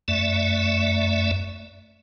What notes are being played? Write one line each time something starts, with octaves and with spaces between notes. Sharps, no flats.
F#2 A3 D5 E5